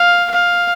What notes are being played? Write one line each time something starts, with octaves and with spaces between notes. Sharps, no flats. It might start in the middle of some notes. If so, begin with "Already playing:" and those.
Already playing: F5
F5